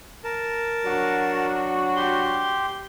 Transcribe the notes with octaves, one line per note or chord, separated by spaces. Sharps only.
A#4 A5
F#3 D4 F#4
G4 C6